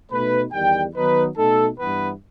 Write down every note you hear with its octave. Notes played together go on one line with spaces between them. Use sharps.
B2 A3 D#4 B4
E2 D#3 G3 G5
D#3 F#3 B3 D#4 B4
B2 A3 D#4 A4
G2 E3 B3 B4